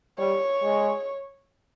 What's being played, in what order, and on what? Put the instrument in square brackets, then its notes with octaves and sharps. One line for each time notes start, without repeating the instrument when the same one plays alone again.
[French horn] G3 [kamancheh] C#5
[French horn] G#3